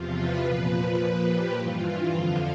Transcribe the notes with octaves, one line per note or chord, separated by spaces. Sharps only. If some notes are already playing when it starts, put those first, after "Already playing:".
Already playing: E2 C3 F3 F4
B4
A#2 F3 B4
A#2 F3
G4
G2 E3 F4
F2 D3 F3